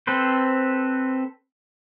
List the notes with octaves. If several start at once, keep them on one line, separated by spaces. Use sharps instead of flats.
C4 A4 B4 C5